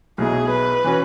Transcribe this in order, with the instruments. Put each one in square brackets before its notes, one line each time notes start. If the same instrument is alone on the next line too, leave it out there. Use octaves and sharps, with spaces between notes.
[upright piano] B1 B2 F#3 E4 [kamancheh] G#4
[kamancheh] B4
[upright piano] E3 C#4 F#4